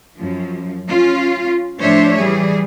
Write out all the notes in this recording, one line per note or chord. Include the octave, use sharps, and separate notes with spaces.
F#2 F3
C#4 F4
A2 F3 D4 C5 C#5 E5
E3 G3 G#4